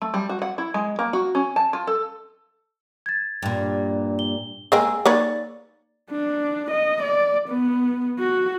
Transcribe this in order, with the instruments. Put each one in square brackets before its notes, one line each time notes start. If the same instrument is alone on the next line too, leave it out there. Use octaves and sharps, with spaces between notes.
[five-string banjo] A3
G3
F#4
F#5
E4
G#3
A#3
F#4
C#4
A5
F4
A4
[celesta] G#6 A6
[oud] G2 A#2
[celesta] G7
[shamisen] G#3 A#3 C4 [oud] G#4 [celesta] E6
[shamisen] A#3 B4 C#5 [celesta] D#4 D5 A6
[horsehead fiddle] D4
D#5
D5
B3
F#4